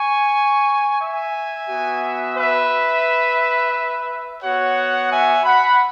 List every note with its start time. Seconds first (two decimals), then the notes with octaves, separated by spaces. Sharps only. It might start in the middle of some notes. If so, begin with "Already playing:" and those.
Already playing: G#5 C#6
1.00 E5 G#5
1.68 B3 F#4
2.37 B4 E5
4.41 B3 F#4 C#5 F#5
5.10 E5 G#5
5.45 F#5 B5